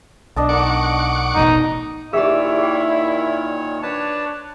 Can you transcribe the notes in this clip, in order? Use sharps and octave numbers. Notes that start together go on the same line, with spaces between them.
B1 D4 D#5 A5
D#3 F#5 C#6 D6
E1 A1 B2 D#4
A#2 D#3 E4 G4 G#4 C#5 D5 E5
G#4 G5
D4 B4 C#5 A5